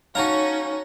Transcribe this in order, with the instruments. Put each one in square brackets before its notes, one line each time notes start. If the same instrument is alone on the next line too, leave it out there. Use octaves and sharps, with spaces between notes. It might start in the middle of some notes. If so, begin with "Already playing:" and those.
[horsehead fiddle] C#4 D#4 [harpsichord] F#4 A5 A#5 [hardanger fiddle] C#5 [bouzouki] F5